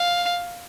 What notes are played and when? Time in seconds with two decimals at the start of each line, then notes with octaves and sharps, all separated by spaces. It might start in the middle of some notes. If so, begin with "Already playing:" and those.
Already playing: F5